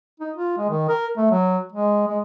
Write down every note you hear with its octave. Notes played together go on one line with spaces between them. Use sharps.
D#4
F4
G#3
D#3
A#4
A3
F#3
G#3
G#3